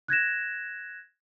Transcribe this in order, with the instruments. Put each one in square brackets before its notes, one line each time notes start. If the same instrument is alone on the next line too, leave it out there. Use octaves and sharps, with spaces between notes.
[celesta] F#6 G#6 A#6 E7